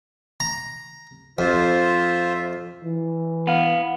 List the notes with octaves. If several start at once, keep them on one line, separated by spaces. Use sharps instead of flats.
A#5
F2 F4 C5 E5
E3
B3 F5